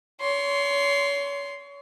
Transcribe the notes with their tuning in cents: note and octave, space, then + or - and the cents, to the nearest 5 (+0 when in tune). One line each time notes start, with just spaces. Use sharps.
C#5 +30 C6 +0